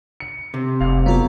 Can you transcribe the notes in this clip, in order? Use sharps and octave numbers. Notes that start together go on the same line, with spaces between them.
C#7
C3
F1 F5
F#2 B3 F4 A4